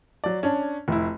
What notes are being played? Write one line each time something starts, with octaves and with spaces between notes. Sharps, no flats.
F#3 D5
C#4 D4
F1 E4